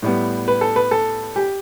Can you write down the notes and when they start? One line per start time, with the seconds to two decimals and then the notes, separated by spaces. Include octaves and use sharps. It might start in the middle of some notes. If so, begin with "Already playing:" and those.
0.02 A2 G3 B3
0.48 B4
0.61 A4
0.76 B4
0.91 A4
1.36 G4